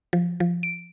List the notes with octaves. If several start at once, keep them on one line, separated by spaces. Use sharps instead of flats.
F3
F3
D7